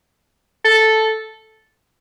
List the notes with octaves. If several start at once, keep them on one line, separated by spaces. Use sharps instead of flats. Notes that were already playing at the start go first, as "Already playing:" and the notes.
A4